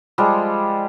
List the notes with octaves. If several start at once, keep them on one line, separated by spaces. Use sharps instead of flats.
F3 G3 G#3